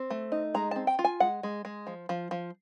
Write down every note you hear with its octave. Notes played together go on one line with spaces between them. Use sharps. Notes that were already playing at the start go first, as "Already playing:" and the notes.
Already playing: C4
A3
D#4
G#3 A#5
C4 A5
G5
F4
G#5
G#3 F#5
G#3
G#3
F3
F3
F3